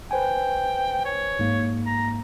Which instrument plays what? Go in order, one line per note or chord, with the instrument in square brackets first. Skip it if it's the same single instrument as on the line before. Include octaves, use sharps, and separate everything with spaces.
[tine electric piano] B4 C5 G#5 [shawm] G5
[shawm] C#5
[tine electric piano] G#2 A#3
[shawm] A#5